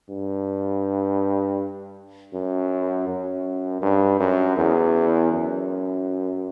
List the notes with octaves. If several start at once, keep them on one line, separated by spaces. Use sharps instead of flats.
G2
F#2
F#2
G2
F#2
E2
F#2